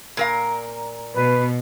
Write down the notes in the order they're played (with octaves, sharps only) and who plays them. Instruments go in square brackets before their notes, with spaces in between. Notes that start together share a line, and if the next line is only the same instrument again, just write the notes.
[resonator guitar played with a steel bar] A#2 A#4 F5
[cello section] B2 [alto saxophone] B4